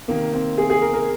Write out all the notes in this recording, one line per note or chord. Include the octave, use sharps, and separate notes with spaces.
C3 D#3 A#3
C4
G#4
G#4
A#4
A#4